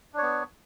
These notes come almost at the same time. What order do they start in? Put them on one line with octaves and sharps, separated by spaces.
D4 C#5 B3